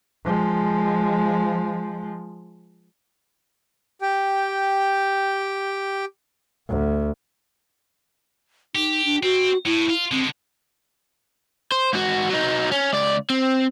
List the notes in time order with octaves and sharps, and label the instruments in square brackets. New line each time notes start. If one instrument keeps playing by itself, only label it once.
[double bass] F3 G#3
[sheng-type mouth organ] G4 G5
[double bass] D2
[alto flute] D#4 [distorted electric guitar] G4
[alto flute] D4
[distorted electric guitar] C4 [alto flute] F#4
[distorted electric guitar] A2 [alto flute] E4
[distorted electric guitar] F4
[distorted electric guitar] D3 G#3 [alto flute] C4
[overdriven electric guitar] C5
G#2 F#4
F#3 D#4
C#4
C#2 D5
C4